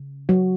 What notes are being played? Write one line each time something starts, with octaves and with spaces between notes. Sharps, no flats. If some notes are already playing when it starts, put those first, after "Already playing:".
Already playing: C#3
F#3 F#4